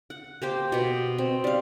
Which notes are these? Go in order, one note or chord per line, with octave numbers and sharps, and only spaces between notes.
F#5
A#3 G4 C5
B2 B3
C4
G3 F5